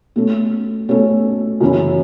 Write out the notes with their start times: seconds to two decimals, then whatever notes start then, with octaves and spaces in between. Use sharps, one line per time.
0.16 B2 A3 C#4 A4
0.89 B2 A3 C#4 A4
1.61 F#2 C#3 E3 C#4 E4